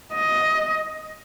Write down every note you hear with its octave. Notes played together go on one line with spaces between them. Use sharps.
D#5